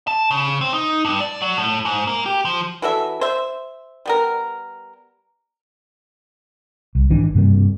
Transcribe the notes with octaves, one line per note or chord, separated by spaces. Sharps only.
A5
C#3
C4
D#4
G2
D5
F#3
A2
G#2
A#3
G4
F3
E3 F#4 A4 E5
C5 E5
G3 B3 A#4
C2
G#1 E3 D4
G2 C3 G3 A#3